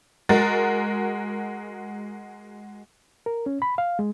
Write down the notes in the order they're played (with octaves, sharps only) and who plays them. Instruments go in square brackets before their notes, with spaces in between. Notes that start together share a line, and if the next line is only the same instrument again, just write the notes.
[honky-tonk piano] G#3 F#4 A#4 A6
[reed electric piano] A#4
C#4
B5
F5
G#3